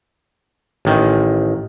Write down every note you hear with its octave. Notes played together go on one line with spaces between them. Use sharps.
A1 D#3